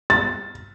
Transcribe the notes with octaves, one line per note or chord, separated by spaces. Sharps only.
A6